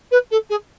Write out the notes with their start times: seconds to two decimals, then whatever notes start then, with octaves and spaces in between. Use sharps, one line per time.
0.11 B4
0.31 A4
0.49 G#4